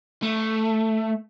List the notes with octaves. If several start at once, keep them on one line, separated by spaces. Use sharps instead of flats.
A3